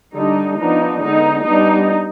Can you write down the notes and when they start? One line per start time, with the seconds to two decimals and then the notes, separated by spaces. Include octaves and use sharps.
0.16 D3 G3 D4 D#4
0.59 F3 B3 D4 D#4
1.02 D3 G#3 B3 D#4
1.45 G3 B3 D4 D#4